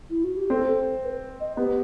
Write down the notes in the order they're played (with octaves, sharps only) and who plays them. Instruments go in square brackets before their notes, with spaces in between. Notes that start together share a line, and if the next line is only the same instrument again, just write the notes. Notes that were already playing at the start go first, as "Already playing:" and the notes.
[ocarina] E4
F#4
G4
[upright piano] C4 [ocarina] A4
[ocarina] B4
D#5
[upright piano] B3 [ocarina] G4